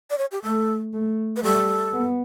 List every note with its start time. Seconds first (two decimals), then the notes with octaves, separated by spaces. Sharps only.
0.10 D5
0.18 C#5
0.32 G4
0.43 A3 A4
0.93 A3
1.36 B4
1.43 G3 A4
1.93 B3